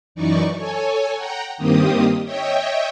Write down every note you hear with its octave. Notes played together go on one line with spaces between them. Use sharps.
F#2 E3 D#4 D5 C#6
A4 C#5 G#5
F#5 G5 A#5
G2 D#3 A#3 C4 G4 D#6
C#5 D#5 E5 G5